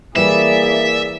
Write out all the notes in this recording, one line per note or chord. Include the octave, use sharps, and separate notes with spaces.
E3 G3 A#3 G#4 D5 E5